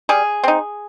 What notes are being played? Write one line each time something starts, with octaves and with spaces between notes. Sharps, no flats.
G3 G#4
C4 D#4